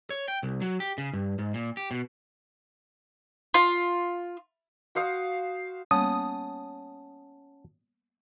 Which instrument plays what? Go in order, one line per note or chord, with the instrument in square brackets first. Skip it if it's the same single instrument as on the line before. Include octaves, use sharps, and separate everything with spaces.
[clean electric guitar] C#5
G5
C2
F#3
G4
C#3
G2
G#2
A#2
G4
B2
[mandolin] F4
[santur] F#4 C5 F5 D#6
[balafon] G3 A#3 B3 [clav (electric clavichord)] C#4 [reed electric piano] F#5 A5 [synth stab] D#6